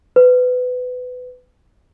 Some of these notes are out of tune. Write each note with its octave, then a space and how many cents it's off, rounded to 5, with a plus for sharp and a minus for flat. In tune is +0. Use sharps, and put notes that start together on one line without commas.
B4 +20